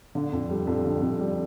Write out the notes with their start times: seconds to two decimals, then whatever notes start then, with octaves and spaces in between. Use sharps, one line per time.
0.15 D3
0.32 F2
0.50 G3
0.67 F2
0.85 D3
1.02 F2
1.19 G3